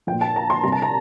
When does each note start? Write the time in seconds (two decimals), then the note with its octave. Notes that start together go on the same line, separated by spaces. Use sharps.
0.07 F3 G5
0.12 A#2
0.21 A5
0.36 A#5
0.50 C6
0.63 C3 G3 A#5
0.72 A5
0.82 A#5